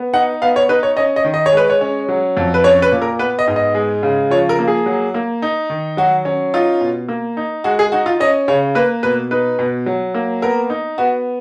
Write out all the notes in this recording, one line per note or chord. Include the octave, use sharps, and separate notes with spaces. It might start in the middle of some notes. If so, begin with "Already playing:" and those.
Already playing: B3
D#4 F#5
B3 F5
C#5
D#4 B4
C#5
C#4 D#5
D#5
D#3
D#5
C#5
G#3 B4
C#5
C#4
F#3
F2
B4
C#4 C#5
B4
A#2
A#4
B3 B4
D#5
G#2
D#5
G#3
C#3
F3 C#5
A#4
A#3
G#4
F#3
A#3
D#4
D#3
F#3 F#4
C#4
D#4 F4
B2
A#3
D#4
G#3 F#4
G#4
D#4 F#4
F4
C#4 D#5
C#3 C#5
A#3 B4
B2 B4
D#4 B4
B2
F#3
A#3
B3 A#4
D#4
B3 F#4